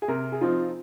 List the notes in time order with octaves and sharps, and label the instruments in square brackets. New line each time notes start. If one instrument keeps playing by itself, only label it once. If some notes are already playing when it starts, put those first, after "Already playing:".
[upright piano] G#4
C3 A#4
G#4
F3 C4 D#4 F4